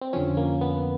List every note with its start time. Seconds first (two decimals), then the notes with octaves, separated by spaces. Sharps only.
0.02 C4
0.13 F2 D3 F3 C#4
0.37 A#3
0.61 B3